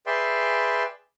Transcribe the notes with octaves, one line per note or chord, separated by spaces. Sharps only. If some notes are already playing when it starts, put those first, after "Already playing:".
G#4 B4 D5 E5 G5 C6